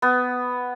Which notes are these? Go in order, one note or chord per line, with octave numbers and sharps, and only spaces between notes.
B3